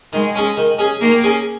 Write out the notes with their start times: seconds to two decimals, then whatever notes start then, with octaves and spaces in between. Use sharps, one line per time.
0.13 D#3 G#3
0.35 C#4 G#4
0.57 D#3
0.79 C#4 G#4
1.01 D#3 A#3
1.24 C#4 G#4